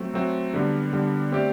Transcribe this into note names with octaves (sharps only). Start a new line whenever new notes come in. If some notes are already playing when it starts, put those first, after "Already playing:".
Already playing: F#3 A3 C4 F#4
F#3 A3 C4 F#4
D3 G3 B3
D3 G3 B3
A3 C4 G4 D5